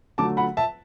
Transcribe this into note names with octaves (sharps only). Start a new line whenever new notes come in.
D3 F#3 A3 A5 D6
F#5 B5
E5 A5